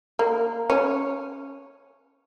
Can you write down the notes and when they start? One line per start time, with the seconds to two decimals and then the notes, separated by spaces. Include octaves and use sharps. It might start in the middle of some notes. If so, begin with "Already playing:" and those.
0.19 A#3
0.70 C#4